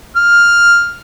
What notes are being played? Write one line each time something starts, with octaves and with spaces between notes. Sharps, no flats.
F6